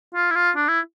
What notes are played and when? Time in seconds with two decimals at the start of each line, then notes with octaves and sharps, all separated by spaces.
0.14 F4
0.30 E4
0.35 F4
0.56 D4
0.68 E4